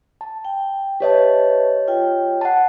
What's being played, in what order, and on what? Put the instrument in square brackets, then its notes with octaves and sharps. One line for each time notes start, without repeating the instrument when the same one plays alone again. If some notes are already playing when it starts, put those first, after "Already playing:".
[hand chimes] A5
[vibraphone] G5
[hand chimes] G4 C#5 D#5 [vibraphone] B4 E5 A5
[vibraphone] F4 G5
[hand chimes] F#5 A5